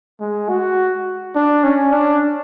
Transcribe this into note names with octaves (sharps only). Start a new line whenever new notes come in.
G#3
F#4
D4
C#4
D4